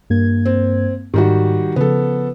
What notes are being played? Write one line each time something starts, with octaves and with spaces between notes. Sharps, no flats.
G2 A#3 G#6
C4
G#2 D#3 G3 F#4
C#3 F3 B3 A4